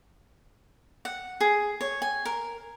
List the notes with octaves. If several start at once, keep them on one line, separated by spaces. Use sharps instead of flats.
F#5
G#4
C#5
G#5
A#4